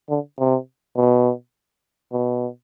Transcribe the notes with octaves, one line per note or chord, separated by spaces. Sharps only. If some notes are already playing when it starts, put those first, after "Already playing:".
D3
C3
B2
B2